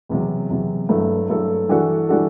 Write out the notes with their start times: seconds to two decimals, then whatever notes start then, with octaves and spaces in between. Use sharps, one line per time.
0.09 E2 C3 F#3
0.50 E2 C3 F#3
0.89 G2 F#3 A3 E4 A4
1.29 G2 F#3 A3 E4 A4
1.69 E3 G3 D4 F#4 A4
2.08 E3 G3 D4 F#4 A4